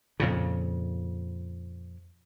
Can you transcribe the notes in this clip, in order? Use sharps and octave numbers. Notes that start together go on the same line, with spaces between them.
F2 A#2 C#3